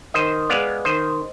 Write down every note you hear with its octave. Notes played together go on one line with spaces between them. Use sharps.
D#3 C5 D#5
G#3 B3 D5 F5
D#3 C5 D#5